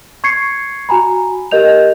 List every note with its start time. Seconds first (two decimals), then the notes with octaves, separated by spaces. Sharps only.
0.24 C#6 G#6 C7 C#7
0.89 F#4 G#5 A#5 B5
1.51 G4 A#4 D#5 G6 F7